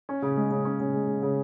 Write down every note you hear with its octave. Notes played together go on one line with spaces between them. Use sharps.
C#4
C#3
G#3
C#3
C#4
C#3
G#3
G#3
C#3